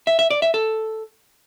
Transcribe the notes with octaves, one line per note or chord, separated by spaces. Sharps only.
E5
E5
D5
E5
A4